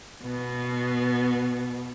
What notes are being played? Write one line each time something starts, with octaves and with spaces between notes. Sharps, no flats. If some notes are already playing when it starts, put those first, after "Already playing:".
B2 B3